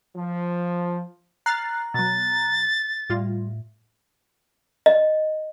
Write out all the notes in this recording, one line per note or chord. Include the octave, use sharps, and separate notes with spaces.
F3
A#5 F6 F#6 A6 C7
B2 F#3 A6
A2 G3 F4
D#5